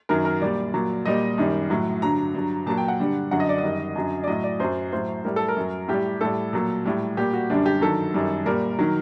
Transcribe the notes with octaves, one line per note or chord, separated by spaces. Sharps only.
F#2 D#3 F#3 A#4
A#4
A#2 G3 D5
A#2 F#3
A#2 G3 D#5
F#2 D#3 G3
A2 F#3
G2 D3 F#3 A#5
G2 F#3
A#2 F#3 A5
G5
F#5
G2 D3 G3
F#2 D3 F#3 F#5
D#5
D5
D#5
F#2 D#3 G3
F#2 D3 F#3
D5
A2 F#3 D#5
D5
F#2 F#3 C5
A2 F#3 C5
A2 G3 A#4
A4
A#4
F#2 F#3
A2 G3 G4
A2 G3 A4
A#2 F#3
A2 G3
A#2 G3 G4
F#4
F#2 D3 G3 D4
G4
G2 D#3 F#3 A4
F#2 D#3 G3
A#2 G3 A#4
D#3 F#3